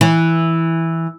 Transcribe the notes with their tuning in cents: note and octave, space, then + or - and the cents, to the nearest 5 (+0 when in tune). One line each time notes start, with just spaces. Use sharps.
E3 -5